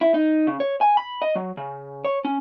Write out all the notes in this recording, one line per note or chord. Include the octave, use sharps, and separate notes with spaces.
E4
D#4
C#3
C#5
G#5
B5
D#5
F#3
C#3
C#5
C#4